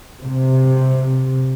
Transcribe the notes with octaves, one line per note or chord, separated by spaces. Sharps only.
C3